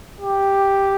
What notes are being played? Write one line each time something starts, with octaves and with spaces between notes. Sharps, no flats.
G4